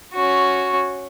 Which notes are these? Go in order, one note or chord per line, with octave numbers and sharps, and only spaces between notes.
C#4 F#4